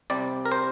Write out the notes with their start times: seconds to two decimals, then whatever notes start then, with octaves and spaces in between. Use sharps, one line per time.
0.10 C2 C3 G3 C4 D5
0.46 A#4
0.52 C5